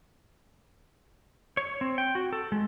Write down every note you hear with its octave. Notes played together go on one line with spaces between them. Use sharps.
C#5
C4
G5
F#4
A4
G#3